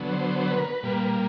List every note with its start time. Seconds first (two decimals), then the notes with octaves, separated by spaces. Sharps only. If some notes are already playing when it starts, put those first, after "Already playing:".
Already playing: D3 F#3 B3
0.11 C5
0.39 C5
0.47 B4
0.58 A#4
0.65 B4
0.83 A#2 G3 A#3